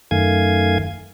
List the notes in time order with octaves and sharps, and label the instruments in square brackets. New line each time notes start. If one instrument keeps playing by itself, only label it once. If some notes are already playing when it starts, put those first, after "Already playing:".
[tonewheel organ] F#2 D#3 A3 F5 G#5 G#6